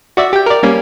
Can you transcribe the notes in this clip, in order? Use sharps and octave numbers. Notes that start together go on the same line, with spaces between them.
F#4 D5 E5
G4 G5
A#4 D5
G3 A#3 C#4